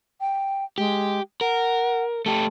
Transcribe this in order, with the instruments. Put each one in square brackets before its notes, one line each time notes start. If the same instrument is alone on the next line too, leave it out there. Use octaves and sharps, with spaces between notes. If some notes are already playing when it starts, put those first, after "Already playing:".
[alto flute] G5
[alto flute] G#3 [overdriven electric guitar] G4
[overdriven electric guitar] A#4 [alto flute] F#5
[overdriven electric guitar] A3 G4 [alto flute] A5